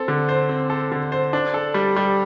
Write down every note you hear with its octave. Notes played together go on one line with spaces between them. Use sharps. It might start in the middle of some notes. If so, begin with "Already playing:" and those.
Already playing: C4 A4
D3
C5
C4
A4
D3
C5
D4
A4
G3
G3